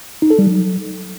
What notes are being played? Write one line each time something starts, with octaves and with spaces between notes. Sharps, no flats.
D#4
A4
G3
F#3